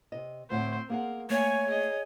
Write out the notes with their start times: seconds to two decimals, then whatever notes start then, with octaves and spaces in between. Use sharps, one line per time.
0.12 C3 D#5
0.50 D2 A2 C4 C5 F#5
0.90 A#3 G#4 A#4 F#5
1.30 A3 A#3 C#5 G#5 C#6
1.67 G#4 D#5